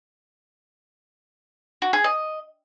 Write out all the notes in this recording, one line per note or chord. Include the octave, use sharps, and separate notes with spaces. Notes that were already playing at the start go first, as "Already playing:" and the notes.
F#4
G#4
D#5